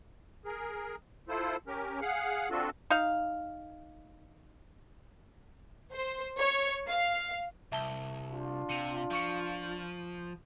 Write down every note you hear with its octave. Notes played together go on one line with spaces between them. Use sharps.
G#4 A#4
E4 F4 A4 C5
C#4 G4 A#4
G#4 F5 F#5
C4 D4 F4 F#4 A4
D#4 F5
C5
C#5
F5
C2 E5 A5 G7
D4 F4
C3 C#7 D#7 F7
F3 F5 C#6 C#7